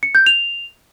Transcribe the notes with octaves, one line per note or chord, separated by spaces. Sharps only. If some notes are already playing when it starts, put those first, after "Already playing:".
C#7
G6
F7